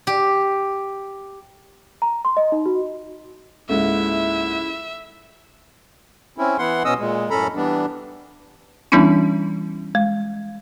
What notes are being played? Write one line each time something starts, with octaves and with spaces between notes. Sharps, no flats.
G4
A#5
C6
D#5
D#4
F#4
C#2 G#2 G#3 A#3 C#4 E4 A4 E5
C4 C#4 E4
E3 B3 E4 F#5 C6
B2 B3 C#4 D#5 D#6 E6
A#2 G#3
F#2 A2 C#4 A4 A#5 B5
E3 G3 B3 D4
E3 G3 B3 C#4 D4 E4
G#3